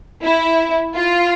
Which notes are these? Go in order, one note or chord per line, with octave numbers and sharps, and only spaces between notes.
E4
F4